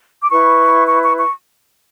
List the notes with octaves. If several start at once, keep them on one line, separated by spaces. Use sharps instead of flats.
D6
E4 B4 C#6
C#6
C#6
C#6